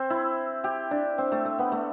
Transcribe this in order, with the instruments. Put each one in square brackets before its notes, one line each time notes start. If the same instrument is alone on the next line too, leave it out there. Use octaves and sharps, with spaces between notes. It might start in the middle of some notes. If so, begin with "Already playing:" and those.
Already playing: [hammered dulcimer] C4
E4
G4
D4
C4
A3
A3
B3
A3